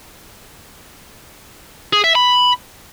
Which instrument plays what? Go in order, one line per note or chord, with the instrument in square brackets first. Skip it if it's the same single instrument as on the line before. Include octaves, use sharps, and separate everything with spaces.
[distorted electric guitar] G#4
E5
B5